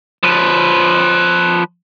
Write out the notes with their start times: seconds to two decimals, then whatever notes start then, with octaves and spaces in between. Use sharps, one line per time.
0.23 F3 B4